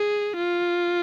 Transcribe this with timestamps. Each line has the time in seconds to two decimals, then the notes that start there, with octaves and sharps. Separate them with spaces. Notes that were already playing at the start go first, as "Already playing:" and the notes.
Already playing: G#4
0.37 F4